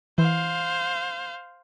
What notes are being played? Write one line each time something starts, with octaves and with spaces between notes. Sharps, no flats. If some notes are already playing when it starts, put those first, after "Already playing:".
E3 C5 F5